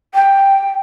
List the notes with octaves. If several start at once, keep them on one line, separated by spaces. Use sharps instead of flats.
G5